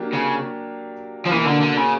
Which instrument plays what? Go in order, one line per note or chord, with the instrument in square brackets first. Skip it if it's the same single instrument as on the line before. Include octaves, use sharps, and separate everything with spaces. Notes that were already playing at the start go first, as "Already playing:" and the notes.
Already playing: [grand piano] F#3 A#3 D4 G4
[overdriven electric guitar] C#3
F3
[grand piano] B2 F#3 A#3 [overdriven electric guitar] E3
[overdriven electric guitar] D3
D3
C#3